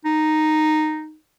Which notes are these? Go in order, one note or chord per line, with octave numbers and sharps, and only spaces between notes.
D#4